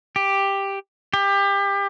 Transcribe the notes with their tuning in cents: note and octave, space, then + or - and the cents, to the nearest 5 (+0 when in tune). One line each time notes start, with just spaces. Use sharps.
G4 +5
G4 +25